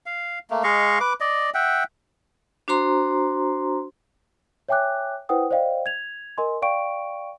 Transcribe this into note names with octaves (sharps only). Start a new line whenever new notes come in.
F5
A3 A#3
G#3 D#5 F5 C#6
B4 D6
D5 D#5
E5 F#5 G5
D4 F#4 C5 A#5 C6
C#5 E5 G5 G#5 D6 F#6
E4 B4 C5 F#5 G5 D#6
C5 D5 D#5 F5 G5
G#6 F7
A#4 D#5 G#5 C6
D5 F5 G5 C#6 D7